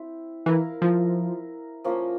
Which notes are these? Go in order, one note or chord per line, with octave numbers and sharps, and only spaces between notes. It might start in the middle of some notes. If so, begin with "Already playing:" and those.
Already playing: C4 E4
E3 E4 A#4 F5
F3
F3 A#3 C#4